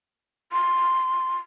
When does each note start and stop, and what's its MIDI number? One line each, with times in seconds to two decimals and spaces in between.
0.52 1.37 84